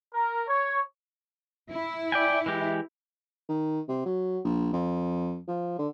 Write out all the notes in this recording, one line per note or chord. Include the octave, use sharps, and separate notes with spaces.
A#4
C#5
E4
D5 G5 G#5
E3 G#3 G4
D#3
C3
F#3
A#1
F2
F3
D3